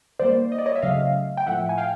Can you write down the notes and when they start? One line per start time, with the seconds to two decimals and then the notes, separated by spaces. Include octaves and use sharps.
0.19 D#3 G3 A#3 C5 D5
0.52 D#5
0.58 D5
0.66 C#5 D#5
0.76 E5
0.82 C#3 F#3 A3 D#5 F5
1.37 G5
1.46 A2 F3 A3 E5 F#5
1.69 G#5
1.78 F5 G5